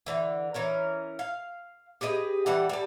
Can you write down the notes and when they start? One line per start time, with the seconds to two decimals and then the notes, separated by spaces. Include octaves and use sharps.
0.06 D3 E3
0.54 E3 C#4 A#4
1.19 F5
2.01 G4 G#4 B4 D#5
2.46 E3 G3 A4 F#5
2.69 G3 A4